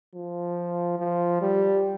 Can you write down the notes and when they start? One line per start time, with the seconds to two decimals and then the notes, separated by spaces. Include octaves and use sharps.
0.15 F3
0.99 F3
1.42 G3